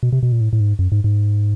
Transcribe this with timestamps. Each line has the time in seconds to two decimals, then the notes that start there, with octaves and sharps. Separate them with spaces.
0.03 B2
0.13 C3
0.23 B2
0.32 A#2
0.41 A2
0.53 A2
0.60 G#2
0.79 F#2
0.92 G#2
1.04 G#2